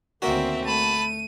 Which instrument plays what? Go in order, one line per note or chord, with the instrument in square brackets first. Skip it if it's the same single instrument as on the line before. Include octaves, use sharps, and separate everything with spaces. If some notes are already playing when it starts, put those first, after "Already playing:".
[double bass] D2 D#3 [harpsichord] A#3 C#4 F#4 [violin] C4 E5
[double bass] A3 [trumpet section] A5 B5 [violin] D#7